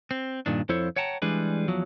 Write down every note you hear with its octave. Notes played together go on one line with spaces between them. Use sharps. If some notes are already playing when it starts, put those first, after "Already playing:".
C4
G2 A#2 D#3 D4
F2 F3 E4 A4 C5 C#5
C#5 F#5 G5 A5 A#5
E3 G3 G#3 D4 G#4 B4
E2 F3 F#3